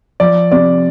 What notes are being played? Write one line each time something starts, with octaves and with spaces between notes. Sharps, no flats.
F3 D5
C3 D5